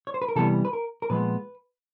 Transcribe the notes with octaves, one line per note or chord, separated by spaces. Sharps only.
C#5
C5
B4
A#4
C3 E3 G3 B3 A4
B4
A#4
A#4
A#2 F3 G#3 B3 B4